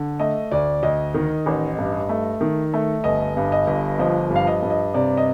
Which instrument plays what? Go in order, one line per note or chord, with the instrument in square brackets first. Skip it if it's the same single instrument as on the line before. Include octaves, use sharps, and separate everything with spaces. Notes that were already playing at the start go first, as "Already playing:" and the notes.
Already playing: [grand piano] D3
A3 D#5
D2 D5
D2 D#5
D#3
A1
G2
A3
D#3
A3
G1 D#5
G2
D#5
G1
F3 D#5
G2
F5
D#5
G2
D#5
C3 D5
D#5